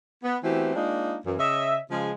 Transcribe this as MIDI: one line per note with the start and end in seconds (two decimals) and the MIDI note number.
0.24 0.37 59
0.43 0.74 52
0.43 0.74 57
0.43 0.74 59
0.43 0.74 60
0.43 0.74 66
0.43 0.74 67
0.75 1.17 56
0.75 1.17 58
0.75 1.17 62
0.75 1.17 63
0.75 1.17 65
1.25 1.36 42
1.25 1.36 52
1.38 1.79 49
1.38 1.79 73
1.38 1.79 75
1.38 1.79 76
1.91 2.12 49
1.91 2.12 53
1.91 2.12 56
1.91 2.12 65
1.91 2.12 68